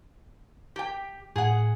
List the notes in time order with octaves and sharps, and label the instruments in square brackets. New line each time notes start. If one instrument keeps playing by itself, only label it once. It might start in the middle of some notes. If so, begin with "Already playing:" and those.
[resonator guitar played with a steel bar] G4 G5
[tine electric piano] A2 [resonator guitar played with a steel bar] G#4 F#5